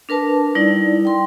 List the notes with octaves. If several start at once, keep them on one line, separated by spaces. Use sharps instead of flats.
D4 A#4 B4 A5
G3 D#4 E4 D5
G5 C6